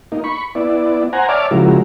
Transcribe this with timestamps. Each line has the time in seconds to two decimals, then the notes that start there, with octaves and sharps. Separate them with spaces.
0.12 A#3 D#4
0.24 B5 C#6
0.55 B3 E4 D5
1.13 C5 F#5 G#5 A#5
1.29 C#5 D5 E5 A5 D6 F6
1.51 C#3 F3 G#3 E4 F#4 A#4